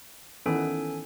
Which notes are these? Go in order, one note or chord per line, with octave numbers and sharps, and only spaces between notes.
D#3 E3 B3 C#4 A4 G#5